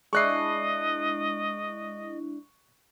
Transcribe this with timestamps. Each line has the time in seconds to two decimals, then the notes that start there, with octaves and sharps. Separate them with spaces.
0.13 G#3 D4 E4 D#5 C#6 F#6 C7